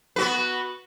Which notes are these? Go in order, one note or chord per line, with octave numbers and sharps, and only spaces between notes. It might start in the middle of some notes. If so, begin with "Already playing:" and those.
B3 F#4 B4